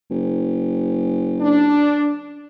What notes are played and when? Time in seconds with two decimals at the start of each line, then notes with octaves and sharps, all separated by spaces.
0.10 F#1
1.40 D4